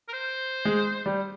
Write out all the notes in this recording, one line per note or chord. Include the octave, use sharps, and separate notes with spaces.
A#4
C5
G#3
G3